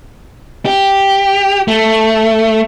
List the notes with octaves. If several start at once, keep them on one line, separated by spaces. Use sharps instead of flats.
G4
A3